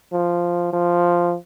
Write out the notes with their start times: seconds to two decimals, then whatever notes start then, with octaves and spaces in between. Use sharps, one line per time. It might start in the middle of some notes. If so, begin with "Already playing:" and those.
0.12 F3
0.73 F3